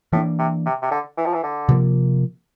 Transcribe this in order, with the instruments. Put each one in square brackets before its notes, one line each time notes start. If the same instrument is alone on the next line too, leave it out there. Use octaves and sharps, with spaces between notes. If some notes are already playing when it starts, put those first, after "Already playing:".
[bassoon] A2 [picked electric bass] E3 A#3 D4
[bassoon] C3
C3
C3
D3
E3
F3
E3
D3
[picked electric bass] C3 F3 A#3